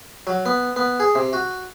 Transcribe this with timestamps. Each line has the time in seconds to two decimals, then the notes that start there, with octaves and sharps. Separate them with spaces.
0.27 F#3
0.46 B3
0.76 B3
1.00 G#4
1.15 C3
1.33 F#4